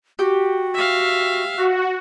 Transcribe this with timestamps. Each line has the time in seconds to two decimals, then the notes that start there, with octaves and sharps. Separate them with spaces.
0.19 F#4 G4
0.74 E5 F5
1.57 F#4